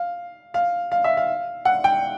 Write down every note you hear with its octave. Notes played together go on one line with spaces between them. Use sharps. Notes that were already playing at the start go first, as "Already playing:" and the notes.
Already playing: F5
F5
F5
E5
F5
F#5
G5